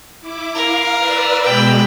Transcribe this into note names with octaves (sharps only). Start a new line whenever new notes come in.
E4 D6
A#4 F5
B4 D5 E6
B2 G#3 G5 B5